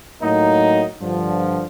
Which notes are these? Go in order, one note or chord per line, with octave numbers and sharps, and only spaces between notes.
A2 F#3 A#3 D#4
G2 D3 F3